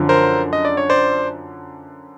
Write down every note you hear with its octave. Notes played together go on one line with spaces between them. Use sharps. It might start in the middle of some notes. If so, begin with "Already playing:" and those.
Already playing: F#2 D3 F3
A#4 C5
D#5
D5
C#5
C5 D5